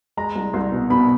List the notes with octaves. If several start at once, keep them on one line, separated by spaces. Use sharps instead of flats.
G#3 A#5
C2
C2 C6
B2
B2 B5